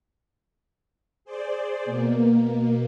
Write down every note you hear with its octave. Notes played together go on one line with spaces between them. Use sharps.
G#4 C5 D5
B2 A#3